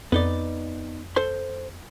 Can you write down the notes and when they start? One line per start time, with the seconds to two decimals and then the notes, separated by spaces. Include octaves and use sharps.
0.12 F2 B3 D#4 D5
1.16 A4 C5 C6